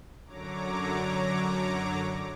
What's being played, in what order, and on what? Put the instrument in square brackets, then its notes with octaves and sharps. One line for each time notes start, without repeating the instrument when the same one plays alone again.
[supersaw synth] F#2 D3 F#3 C#5 A#5 D6